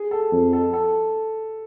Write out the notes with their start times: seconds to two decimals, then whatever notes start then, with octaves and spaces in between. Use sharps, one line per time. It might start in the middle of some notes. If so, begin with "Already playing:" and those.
Already playing: G#4
0.11 A4
0.32 F2
0.53 A4
0.73 A4